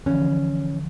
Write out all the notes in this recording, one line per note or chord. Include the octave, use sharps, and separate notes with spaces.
D3 E3 F3 C#4